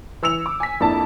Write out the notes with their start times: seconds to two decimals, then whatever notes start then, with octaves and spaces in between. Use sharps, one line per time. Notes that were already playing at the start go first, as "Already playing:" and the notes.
0.23 E3 E6 C#7 F7
0.46 D6
0.60 G#5 B6
0.80 F2 A#3 D4 E4 A5